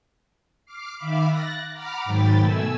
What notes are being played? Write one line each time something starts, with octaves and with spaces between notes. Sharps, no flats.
D6 F6 C7
D#3 E5 F5 B5 D6
F#6 A6 A#6
F#5 A#5 B5 D6 F6
G#2 D#3 F#3 G5 B5 A6
B2 A3 G#5 E6